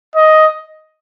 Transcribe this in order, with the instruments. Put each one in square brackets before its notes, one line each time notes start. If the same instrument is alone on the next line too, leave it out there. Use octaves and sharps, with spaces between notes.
[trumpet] D#5